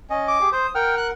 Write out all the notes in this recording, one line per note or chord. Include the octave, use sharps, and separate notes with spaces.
C#4 D#5
D6
G4 G#4
C5 D#6
A#4 F#5 G5 F6
F#6